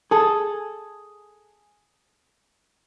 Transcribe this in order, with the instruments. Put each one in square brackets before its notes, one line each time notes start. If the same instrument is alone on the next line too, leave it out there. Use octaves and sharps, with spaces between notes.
[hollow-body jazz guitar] G#4 A4